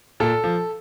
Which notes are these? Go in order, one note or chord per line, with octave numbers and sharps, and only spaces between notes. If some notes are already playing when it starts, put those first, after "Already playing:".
A#2 A4
F3